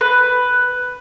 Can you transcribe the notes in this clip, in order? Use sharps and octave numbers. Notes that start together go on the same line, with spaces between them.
B4